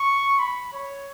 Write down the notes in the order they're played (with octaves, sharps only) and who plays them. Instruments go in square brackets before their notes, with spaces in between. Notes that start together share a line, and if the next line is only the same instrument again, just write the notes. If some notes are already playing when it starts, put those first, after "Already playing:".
Already playing: [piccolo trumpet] C#6
B5
C#5